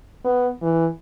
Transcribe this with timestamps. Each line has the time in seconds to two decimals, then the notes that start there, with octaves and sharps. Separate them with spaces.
0.24 B3
0.62 E3